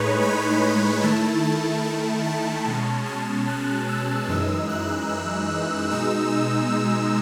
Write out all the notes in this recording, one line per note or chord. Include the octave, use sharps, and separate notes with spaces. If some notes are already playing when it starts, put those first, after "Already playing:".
Already playing: A2 G#3 D#4 B4 C#5
B5
B5
D#3 A3 E4 A5
A5
A5
A5
B2 G#3 C#4 A5
A5
F#6
E6
F#2 E3 G#3 D#4 E6
F#6
E6
F#6
B2 G#3 D#4 E6
E6
E6